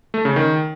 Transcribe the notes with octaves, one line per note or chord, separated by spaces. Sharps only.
A3
C#3
D#3